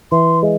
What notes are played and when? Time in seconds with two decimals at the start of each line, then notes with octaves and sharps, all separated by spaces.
0.12 E3 C6
0.43 G#3